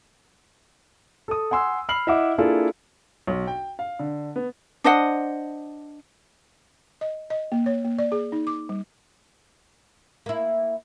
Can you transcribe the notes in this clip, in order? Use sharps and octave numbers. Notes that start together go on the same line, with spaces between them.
A4 D#6
F#5 G#5 C6 E6
B5 F6 C7 F#7
E4 D#5 E5 F#5 D6
A#3 D4 E4 F4 G#4 A4
B1
G5
F5
D3
B3
D4 C5 D#5 F#5
D#5
D#5
A#3
C#5
A#3
D5
G#4
D#4
D6
G3
A#3 E4